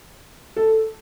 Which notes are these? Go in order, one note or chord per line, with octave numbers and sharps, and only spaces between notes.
A4